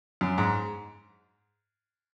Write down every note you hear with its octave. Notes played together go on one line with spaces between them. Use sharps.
F#2
G#2